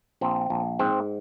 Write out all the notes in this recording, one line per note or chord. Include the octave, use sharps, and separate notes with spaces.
A#1 C4
A#1
G#2 C4